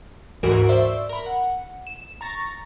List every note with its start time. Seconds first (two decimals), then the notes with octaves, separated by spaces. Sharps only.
0.43 D2 G#2 E3 F#4 A#4 D7
0.69 C5 D5 E5 C#6 E6
1.09 A#4 B5
1.26 F#5
1.87 E7
2.21 A#5 C#6 A6 A#6